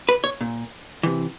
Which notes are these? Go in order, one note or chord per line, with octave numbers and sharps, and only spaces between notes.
B4
C#5
A#2
C3 E3